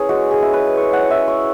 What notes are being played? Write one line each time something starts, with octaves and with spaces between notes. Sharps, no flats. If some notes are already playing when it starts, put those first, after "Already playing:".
Already playing: C#4 E4 G#4 B4 C#5
G#3 F#4
G#4
C#4 E4
B4
G#3 C#5
F#5
C#4 E4 E5
C#5